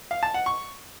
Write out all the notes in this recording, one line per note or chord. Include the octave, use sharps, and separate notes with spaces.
F5
A5
F#5
C#6